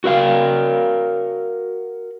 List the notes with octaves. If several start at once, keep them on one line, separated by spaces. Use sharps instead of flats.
F#4 A#4 F5